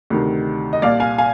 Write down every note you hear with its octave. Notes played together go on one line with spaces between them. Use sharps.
D2 C3 D#3
D#5
C2 A#2 D5 F5
F5 G#5
F5 G#5